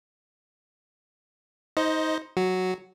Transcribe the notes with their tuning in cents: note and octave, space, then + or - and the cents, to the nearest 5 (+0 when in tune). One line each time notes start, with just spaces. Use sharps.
D#4 +25 C5 +0 D#5 +0
F#3 +0 F#4 +0